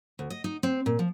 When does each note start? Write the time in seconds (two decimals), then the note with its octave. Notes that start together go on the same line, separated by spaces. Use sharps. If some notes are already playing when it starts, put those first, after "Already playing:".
0.19 D2
0.30 D#5
0.44 D#4
0.63 C4
0.86 A#2
0.99 F3